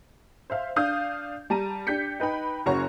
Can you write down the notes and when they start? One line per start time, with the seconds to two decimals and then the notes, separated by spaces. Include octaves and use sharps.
0.50 C5 E5 F5
0.76 D4 F5 D#6 G6
1.50 G3 A5 A#5 D#7
1.87 D4 G4 G6 B6 C#7
2.20 D#4 B4 G5 B5
2.66 F#1 C#3 F#4 C#5 A#5 C#6